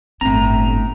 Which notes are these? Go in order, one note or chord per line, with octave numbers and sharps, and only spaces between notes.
G1 A2 C4 A#5